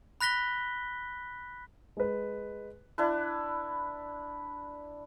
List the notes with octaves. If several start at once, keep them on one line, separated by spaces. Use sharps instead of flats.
B5 F#6 A#6 B6 G7
G#3 B4
D4 E4 B4